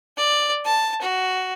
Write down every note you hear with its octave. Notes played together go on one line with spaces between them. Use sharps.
D5
A5
F#4